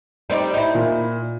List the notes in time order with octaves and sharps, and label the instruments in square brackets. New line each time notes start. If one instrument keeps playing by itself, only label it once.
[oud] G3 C4 D#4
D#4 E4
[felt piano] A#2